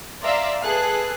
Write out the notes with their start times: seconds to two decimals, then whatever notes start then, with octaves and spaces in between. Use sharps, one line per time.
0.23 D5 E5 F5 A#5 C6
0.62 G#4 A4 B4 F#6